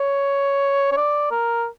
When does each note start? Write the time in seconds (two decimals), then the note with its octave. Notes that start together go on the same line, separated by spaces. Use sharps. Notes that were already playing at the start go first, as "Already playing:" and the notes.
Already playing: C#5
0.92 C#5
0.97 D5
1.31 A#4